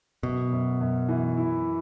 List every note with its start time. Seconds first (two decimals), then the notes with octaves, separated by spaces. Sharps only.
0.23 F#2 B2
0.52 F#2
0.81 F#2
1.08 E3
1.37 E4